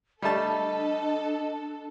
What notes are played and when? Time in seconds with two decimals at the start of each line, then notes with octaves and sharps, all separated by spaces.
0.22 G3 A3 D4 A4 D#5 A5